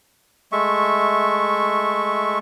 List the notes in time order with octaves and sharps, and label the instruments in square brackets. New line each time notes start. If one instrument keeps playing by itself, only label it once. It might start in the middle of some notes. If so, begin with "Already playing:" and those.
[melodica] G#3 A3 E5 C#6